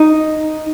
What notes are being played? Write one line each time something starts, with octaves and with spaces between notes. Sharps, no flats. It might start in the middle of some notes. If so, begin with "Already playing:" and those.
Already playing: D#4